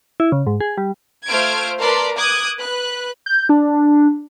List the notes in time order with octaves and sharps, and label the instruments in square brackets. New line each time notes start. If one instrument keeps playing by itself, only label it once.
[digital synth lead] E4
C#3
G#2
G#4
G3
[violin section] A3 F4 C5 F6 G#6 D7
A#4 B4 D5 A5 C6
D6 D#6 F#6 G#6
B4 F#6
[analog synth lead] G6
D4